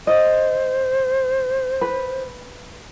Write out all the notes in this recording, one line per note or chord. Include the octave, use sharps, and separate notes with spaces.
C5 D#5
B4